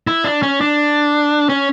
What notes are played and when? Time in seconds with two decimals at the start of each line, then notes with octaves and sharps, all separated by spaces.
0.07 E4
0.24 D4
0.43 C#4
0.61 D4
1.49 C#4